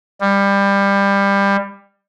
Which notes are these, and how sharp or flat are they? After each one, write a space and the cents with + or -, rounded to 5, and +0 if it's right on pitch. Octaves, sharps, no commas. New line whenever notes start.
G3 +20